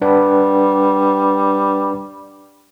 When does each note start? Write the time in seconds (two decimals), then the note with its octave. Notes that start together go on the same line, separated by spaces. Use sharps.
0.02 G3 D4 B4 F#5